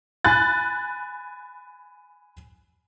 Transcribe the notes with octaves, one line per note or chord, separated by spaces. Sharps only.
G#5 B5 F#6 A6